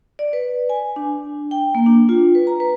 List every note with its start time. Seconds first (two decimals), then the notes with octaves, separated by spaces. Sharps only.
0.19 D5
0.33 B4
0.69 G#5
0.96 D4
1.51 G5
1.75 A#3
1.86 D4
2.09 F4
2.35 B4
2.47 A#5
2.60 B4